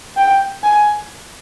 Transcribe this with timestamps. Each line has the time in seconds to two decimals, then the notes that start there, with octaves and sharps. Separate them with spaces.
0.17 G5
0.63 G#5